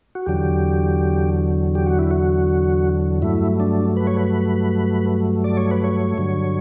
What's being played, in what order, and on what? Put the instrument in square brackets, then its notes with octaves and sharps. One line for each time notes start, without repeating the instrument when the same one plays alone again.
[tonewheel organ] F#4
E2 D3 F#3 G4
G4
F#4
E4
F#4
G2 F#3 A3 E4
D4
B4
C#5
B4
D5
C#5
B4
C#5
G2 D3 F#3